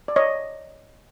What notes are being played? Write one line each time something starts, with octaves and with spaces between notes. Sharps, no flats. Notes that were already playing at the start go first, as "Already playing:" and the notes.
D5
C#5 D#5